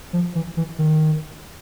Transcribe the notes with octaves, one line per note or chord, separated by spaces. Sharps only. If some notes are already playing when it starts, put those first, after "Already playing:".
F3
E3
E3
D#3